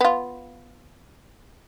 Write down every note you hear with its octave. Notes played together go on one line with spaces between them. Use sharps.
B3 F4